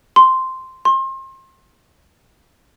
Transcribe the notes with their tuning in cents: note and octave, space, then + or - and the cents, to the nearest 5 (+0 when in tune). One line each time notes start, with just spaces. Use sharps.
C6 -5
C6 +35